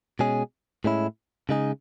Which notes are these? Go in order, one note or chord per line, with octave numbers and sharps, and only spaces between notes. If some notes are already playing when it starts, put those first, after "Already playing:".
B2 G#3 C#4 G#4
A2 G#3 C#4 E4
C#3 G#3 D#4 G#4